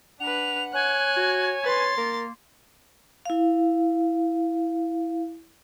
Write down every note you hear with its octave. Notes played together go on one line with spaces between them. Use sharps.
D4 B4 F#5 F7
C#5 G#5 F#6
F#4
B4 C6 A6
A#3 A#4
E4 F5